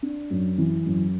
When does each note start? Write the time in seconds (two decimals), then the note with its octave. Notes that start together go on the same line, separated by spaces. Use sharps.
0.03 D4
0.30 F#2
0.58 E3
0.86 F#2